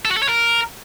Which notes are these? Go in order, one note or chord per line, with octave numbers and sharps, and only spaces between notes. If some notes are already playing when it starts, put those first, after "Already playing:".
A4
F#4
A4
C#5
A#4